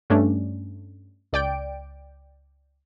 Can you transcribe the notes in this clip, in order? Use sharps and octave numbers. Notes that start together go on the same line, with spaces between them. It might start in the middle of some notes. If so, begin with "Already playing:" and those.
G2 A3 C#4 D4
C#2 D5 G5 D7